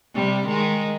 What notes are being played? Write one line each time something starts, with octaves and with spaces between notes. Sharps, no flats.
C3 G3
D#3 G#3